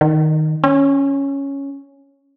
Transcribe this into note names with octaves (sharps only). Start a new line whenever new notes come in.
D#3
C#4